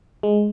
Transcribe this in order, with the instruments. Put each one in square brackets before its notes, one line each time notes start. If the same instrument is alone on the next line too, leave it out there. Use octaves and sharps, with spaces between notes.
[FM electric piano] G#3